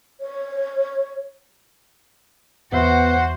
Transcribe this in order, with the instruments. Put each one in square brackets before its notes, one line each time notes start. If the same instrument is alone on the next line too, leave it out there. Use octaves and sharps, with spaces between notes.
[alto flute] C#5
[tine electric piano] E2 E5 [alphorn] B3 [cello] F#4 C5 [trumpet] F#5